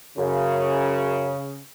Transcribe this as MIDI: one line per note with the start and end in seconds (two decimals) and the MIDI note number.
0.18 1.31 42
0.18 1.58 49